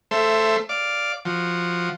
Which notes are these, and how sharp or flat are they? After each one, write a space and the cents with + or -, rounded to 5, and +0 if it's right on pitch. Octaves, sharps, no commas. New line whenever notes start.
A3 +0 C5 +0 E5 +20
D5 +0 F5 +0
F3 +0 F#4 +0